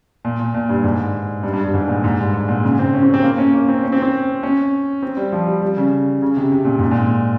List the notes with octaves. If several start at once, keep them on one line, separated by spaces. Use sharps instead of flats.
A#2
A#2
A#2
G2
G#2
G2
G2
G2
G#2
A#2
G#2
G2
G#2
A#2
C#3
C4
C#4
C4
C4
A#3
C#4
A#3
C4
C#4
C4
C4
C#4
C4
G3
F3
G3
G3
C#3
C#3
C3
C3
A#2
G#2
A#2